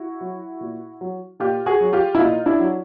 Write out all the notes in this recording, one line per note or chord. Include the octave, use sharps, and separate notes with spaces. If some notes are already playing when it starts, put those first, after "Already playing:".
Already playing: E4 F#4
F#3
A#2
F#3
A#2 F4 G4
F#4 G#4
F#3
F4 G4
E4
A#2 D#4 F4
D4 E4
F#3